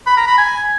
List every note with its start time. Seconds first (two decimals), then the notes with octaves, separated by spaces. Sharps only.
0.07 B5
0.17 A#5
0.27 B5
0.38 G#5